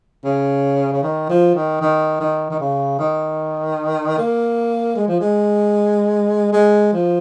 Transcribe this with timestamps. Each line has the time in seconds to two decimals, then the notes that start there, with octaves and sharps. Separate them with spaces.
0.24 C#3
0.92 C#3
1.03 D#3
1.29 F3
1.55 D#3
1.81 D#3
2.20 D#3
2.51 D#3
2.60 C#3
2.99 D#3
4.18 A#3
4.96 G#3
5.08 F3
5.20 G#3
6.53 G#3
6.93 F3